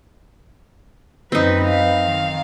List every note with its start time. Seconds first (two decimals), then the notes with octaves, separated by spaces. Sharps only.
1.32 F#2 C4 D#4 B4
1.67 F5
2.05 D#3